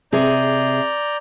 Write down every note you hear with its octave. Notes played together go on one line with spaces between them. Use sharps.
C3 G#4 D5 A#5 G6